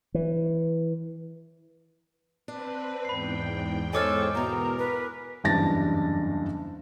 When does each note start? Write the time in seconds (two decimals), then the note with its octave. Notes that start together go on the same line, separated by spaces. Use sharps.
0.14 E3
2.48 C4 D4 B4
3.05 E2 G#2 G5 B5 C7
3.93 A4 C5 C#5 D#5 G#5 D6 F6
4.35 E2 B2 A#4 A#5
4.78 B4
5.44 F#1 E2 G2 D4 A6 A#6